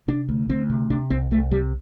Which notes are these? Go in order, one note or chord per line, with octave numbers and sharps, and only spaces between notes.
C3 D4
D2
D2 C4
C3
C3 D4
C2 C4
C2 A3
C3 G3